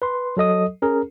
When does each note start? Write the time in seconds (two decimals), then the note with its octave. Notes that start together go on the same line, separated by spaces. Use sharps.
0.02 B4 C6
0.37 F#3 A4 D#5 D#6
0.82 C#4 G#4 A#4